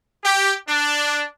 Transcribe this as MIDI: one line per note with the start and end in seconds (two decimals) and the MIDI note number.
0.24 0.53 67
0.68 1.23 62